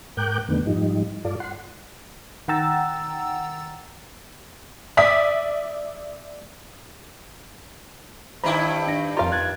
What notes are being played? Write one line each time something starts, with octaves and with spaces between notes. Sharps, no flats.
G#2 A#4 G5 D6 F#6 G6
F2 D3 D#3 A3 B3
G#2 F3 G3 D#4
G2 F4 A4 D5
F#5 C6
D#3 F#5 G5 A#5 E6 A6
D5 E5 D#6 B6
G2 D#3 E4 C5 A#5 B5
D4 A#6
F2 F4 A#4 F5 A#5
F#6 G#6 A6